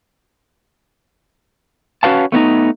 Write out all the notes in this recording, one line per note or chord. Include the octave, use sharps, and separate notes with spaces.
C#4 F#4 B4 F5 A5
A3 B3 C#4 D#4